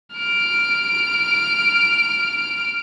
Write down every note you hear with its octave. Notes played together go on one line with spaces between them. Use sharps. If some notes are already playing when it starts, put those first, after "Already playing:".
F6 D7